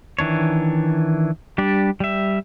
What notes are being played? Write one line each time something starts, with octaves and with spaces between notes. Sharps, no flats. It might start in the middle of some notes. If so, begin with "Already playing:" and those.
D#3 E3 D4 C#5
G3 D4 G4 D5
G3 E5